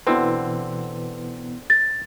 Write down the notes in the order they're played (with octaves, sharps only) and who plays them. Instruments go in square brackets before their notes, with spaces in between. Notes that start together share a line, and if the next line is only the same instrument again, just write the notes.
[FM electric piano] B2 E3 B3 [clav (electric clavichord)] D3 C4
[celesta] A6